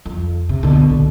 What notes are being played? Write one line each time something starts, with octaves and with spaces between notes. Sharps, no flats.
F2
C3
B2 D3
A#1